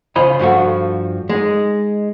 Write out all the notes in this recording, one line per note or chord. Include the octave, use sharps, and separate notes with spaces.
C#3 F4 C5 D#5 B5
G2 F3 F#4 A4
G#3 D#4